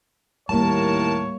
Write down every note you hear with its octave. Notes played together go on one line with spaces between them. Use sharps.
D#2 A2 G3 A#3 A#4 C#5 A5